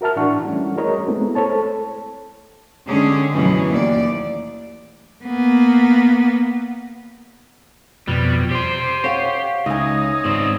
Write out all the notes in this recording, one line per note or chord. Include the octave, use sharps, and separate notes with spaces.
F#4 A#4 E5 A5 F6
A2 E3 D4 E4 F#5 C#6
E3 G3 A3 C#4 E4
F#4 G#4 A#4 C#5 D#5 A#5
G#3 A3 B3 C4 E4
A4 C5 C#5 A5
D3 G#3 C#4 G4 G#4
F#2 B2 E3 F#3 A3 C#4
D#2 D5
A#3 B3
F2 B2 G3
G4 C5 C6
G4 C#5 F5 F#5
C#2 D#4 E5 G#5
G#2 C4 D5